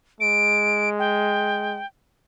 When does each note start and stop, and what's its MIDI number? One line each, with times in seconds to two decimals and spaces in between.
0.20 1.81 56
0.20 0.90 98
0.99 1.87 79